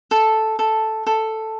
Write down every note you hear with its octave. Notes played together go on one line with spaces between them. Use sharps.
A4
A4
A4